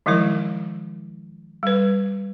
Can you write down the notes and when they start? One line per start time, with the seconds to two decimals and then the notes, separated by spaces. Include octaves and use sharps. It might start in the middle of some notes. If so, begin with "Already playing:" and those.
0.06 D#3 F3 F#3 G#3 E4 A#4
1.63 G3 B4